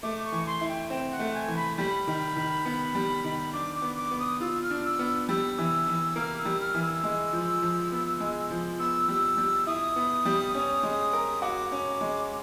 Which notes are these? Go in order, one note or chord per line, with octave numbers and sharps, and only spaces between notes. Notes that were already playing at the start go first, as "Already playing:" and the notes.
A3 D6
C#6
E3
C6
E4
G5
C4 G5
F#5
A3
G#5
E3
B5
G3 B5
D#3
D#3
B3
G3
D#3
D4 D6
D6
B3
D6
B3
D#6
F4 E6
F6
D4
E6
B3
E6
G3 E6
E3
E3
A#3 F6
E6
G3
F6
E3
E6
G#3
F3
F3
B3
G#3
F3
B3 E6
G3
G3
E4 D#6
B3
G3
C#4
G#3
A#4
F#4 D6
C#4
G#3